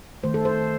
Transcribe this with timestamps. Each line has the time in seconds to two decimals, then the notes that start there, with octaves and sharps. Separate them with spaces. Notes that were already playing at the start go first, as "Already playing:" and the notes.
0.23 D#3 A3 C5
0.34 A4
0.45 C5